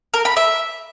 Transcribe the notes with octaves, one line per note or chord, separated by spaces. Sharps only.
A#4
B5
E5